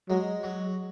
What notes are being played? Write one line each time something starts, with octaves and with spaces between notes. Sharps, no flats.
F#3 G#3
F#3